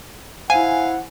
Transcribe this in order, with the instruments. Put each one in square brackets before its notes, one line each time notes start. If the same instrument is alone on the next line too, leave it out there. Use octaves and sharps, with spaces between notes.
[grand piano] E4 C5 [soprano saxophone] F5 [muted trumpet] F#5 [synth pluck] G#5